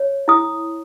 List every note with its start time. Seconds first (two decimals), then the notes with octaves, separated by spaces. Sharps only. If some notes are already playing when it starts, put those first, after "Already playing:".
Already playing: C#5
0.28 E4 D#6